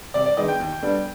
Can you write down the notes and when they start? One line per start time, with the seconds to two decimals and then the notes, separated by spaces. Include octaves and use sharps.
0.14 C3 D5
0.26 D5
0.37 D#3 G#3 B3 D4 D#5
0.48 G5
0.60 D#2
0.83 D3 G3 B3 D4